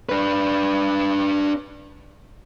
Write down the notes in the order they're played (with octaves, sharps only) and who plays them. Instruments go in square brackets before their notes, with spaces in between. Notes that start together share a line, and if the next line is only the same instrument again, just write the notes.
[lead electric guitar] D4 B4